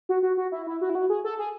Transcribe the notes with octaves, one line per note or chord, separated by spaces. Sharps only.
F#4
F#4
F#4
E4
E4
F#4
E4
F#4
G#4
A4
G#4